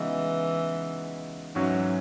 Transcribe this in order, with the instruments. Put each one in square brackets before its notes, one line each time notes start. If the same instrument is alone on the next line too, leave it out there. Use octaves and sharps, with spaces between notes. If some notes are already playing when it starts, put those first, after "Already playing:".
Already playing: [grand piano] C#3 G#3 B3 D#4 F#4 [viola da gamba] E3
[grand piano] G#2 F#3 C#4 F#4 [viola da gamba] E3